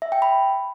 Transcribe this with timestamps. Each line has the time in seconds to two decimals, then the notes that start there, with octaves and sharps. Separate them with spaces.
0.02 E5
0.12 G5
0.22 B5